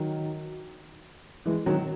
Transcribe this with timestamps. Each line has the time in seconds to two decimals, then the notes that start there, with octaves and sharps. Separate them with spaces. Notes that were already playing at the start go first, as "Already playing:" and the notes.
Already playing: D#3 F#3
1.45 E3 G#3
1.66 D#3 F#3